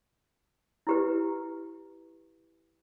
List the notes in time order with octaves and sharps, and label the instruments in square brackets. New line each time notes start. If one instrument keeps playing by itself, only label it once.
[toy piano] E4 G4 B4